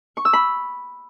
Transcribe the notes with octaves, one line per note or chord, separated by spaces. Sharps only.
C#6
E6
B5